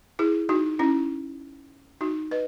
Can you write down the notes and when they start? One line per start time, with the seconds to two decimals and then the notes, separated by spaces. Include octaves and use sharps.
0.19 E4 G#4
0.49 D#4 F#4
0.79 C#4 E4
2.01 D#4 F#4
2.31 B4 D#5